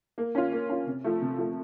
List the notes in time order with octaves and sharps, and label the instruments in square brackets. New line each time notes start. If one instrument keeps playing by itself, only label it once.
[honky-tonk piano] A#3
C#4 F4
A#3
C#4 F4
C3
F3 A3
C3
F3 A3